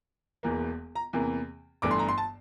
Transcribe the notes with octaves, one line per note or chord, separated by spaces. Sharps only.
E1 E2 E3 A#3
A#5
E2 C3 E3 A#3
G1 G2 E3 A3 D6
C6
A#5
C6
A5